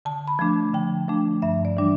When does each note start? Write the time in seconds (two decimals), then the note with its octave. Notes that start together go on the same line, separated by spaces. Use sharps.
0.05 D3 A5
0.28 B5
0.39 F3 A3 D4
0.73 D3 G5
1.08 F3 A3 D4
1.42 G2 E5
1.65 D5
1.77 E3 G3 D4